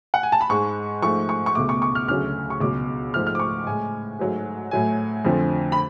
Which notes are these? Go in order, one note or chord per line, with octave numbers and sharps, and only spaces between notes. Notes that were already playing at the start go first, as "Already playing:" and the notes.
F#5
G#5
A5
B5
G#2 G#3 C#6
G#2 F3 A3 C#6
C#6
C#6
C#2 B2 A3 D6
C#6
C#6
F6
D2 C#3 F#3 A3 F6
C#6
C#2 B2 F#3 D6
G#2 F3 A3 F6
F6
D6
C#6
A2 G#3 G#5
G#2 F#3 A3
A2 F#3 A3 G#5
F2 D3 F3 A3
B5